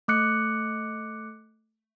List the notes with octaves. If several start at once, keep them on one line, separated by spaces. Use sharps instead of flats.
A3 D6 F#6 C#7